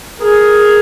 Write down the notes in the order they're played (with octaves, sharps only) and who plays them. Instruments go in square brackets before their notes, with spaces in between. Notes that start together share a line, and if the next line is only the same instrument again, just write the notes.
[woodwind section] G#4 [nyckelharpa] A#4